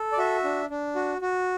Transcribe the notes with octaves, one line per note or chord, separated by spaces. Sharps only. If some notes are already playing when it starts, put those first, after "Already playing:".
Already playing: A4
D5
F#4 E5
D4
D4
F#4
F#4